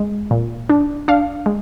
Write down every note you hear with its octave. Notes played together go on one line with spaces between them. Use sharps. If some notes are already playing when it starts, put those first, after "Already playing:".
Already playing: G#3
A#2
D4
D4 F5
G#3